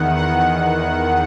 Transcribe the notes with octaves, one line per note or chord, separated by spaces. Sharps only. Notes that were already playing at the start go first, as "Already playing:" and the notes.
Already playing: E2 D#3 F#5
F#5